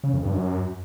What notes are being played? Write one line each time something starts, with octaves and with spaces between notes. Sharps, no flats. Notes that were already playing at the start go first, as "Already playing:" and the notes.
C#3
F2
G2
F#2